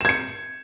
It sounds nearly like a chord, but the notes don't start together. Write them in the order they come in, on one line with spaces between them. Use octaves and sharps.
E7 G#6 C#7